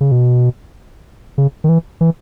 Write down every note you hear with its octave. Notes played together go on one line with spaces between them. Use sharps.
C#3
B2
C#3
D#3
E3
E3